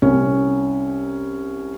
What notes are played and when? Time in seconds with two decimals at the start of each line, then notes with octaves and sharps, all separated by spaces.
0.02 C2 C#4